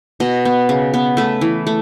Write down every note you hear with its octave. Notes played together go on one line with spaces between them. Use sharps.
B2 D#5
B3
C#3
B3
A3 B4
E3
A3